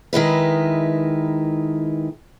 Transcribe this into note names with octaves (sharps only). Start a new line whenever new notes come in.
D#3 G#3 E4 B4